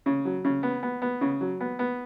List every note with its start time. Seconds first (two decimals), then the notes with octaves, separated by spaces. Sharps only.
0.06 C#3
0.25 F#3
0.45 C#3
0.63 B3
0.83 B3
1.02 B3
1.21 C#3
1.41 F#3
1.60 B3
1.79 B3